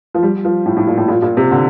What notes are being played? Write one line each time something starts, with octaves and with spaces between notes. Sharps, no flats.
F3
G3
F3
A2
A2
A#2
A2
A#2
A#2
C3
D3